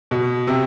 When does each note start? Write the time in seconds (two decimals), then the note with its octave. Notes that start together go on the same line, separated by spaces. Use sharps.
0.11 B2
0.47 C3